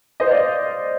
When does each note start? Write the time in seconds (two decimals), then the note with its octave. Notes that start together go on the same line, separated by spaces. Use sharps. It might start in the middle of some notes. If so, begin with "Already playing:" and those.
0.20 C5 D#5
0.31 D5 F5